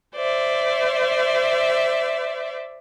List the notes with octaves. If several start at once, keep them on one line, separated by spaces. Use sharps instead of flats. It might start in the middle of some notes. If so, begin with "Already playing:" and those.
C5 D5 E5